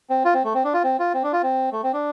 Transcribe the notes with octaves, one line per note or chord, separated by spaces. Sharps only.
C4
F4
C4
A3
C4
D4
F4
C4
F4
C4
D4
F4
C4
A3
C4
D4